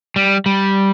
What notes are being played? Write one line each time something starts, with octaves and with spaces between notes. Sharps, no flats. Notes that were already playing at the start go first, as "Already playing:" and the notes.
G3
G3